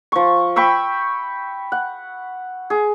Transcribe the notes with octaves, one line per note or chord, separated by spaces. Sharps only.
F3 C#6
G5 B5 C#6 E6
F#5
G#4